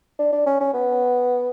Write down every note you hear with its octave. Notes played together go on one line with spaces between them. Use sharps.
D4
D4
C#4
C#4
B3